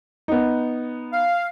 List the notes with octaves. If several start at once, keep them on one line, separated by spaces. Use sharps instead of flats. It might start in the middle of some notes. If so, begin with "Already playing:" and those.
B3 D#4
F5